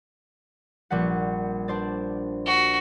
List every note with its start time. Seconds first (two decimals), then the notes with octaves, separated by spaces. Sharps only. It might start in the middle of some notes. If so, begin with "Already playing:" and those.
0.91 A#1 G3 F#5
1.68 D4 C5 D5
2.46 F#4